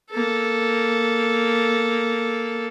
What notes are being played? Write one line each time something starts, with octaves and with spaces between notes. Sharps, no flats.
A#3 A4